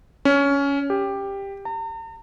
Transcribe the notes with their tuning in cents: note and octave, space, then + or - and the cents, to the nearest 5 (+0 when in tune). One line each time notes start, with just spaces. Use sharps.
C#4 +15
G4 +10
A#5 -45